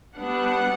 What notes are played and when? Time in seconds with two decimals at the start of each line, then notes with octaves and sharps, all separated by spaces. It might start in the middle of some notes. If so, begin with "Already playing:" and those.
0.16 G3 B3 D4 F#5